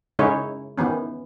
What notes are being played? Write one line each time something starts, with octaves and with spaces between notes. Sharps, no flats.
C#3 G#3 C#4 D#4 E4 C#5
D#3 E3 B3 C#4